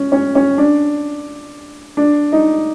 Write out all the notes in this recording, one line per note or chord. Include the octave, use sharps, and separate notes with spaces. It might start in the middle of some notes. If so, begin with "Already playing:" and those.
Already playing: C#4
C#4
C#4
D4
D4
D#4